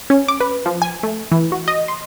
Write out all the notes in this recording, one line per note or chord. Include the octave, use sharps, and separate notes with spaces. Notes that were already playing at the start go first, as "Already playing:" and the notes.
C#4
D6
B4
F3
G#5
A3
E3
F#4
D#5
C6